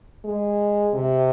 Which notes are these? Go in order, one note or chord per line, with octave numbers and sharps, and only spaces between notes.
G#3
C3